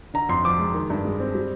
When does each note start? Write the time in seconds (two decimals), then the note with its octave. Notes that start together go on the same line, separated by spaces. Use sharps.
0.14 D3 A#5
0.29 F2 C6
0.45 F3 D6
0.59 G#3
0.74 D#3
0.90 G2
1.05 G#3
1.20 C4
1.35 G3